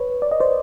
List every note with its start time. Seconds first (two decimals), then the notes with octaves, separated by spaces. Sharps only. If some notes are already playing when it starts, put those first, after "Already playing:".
Already playing: B4 C#5
0.22 D5
0.31 D#5
0.40 C5 D5